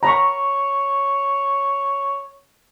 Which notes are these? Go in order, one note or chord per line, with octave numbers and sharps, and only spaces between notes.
C#5 A#5 B5 C#6